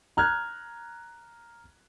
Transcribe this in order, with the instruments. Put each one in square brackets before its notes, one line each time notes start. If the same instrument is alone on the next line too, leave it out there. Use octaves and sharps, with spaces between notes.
[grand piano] A#5 F6 F#6 G#6